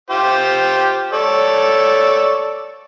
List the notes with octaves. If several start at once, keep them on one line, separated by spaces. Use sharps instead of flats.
F4 G4 C5
A4 C#5 D5